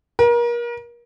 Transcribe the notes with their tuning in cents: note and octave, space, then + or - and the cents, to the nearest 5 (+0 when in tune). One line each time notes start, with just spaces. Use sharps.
A#4 +35